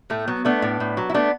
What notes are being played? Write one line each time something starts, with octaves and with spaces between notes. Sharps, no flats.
A2 A3
F#3 B3
A3 B3 D4
A2
A2
F#3
E4
A3 B3 D4